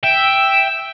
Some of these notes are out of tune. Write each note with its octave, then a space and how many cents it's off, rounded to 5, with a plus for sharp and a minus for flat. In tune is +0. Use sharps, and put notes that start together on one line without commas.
E5 +0 G5 +0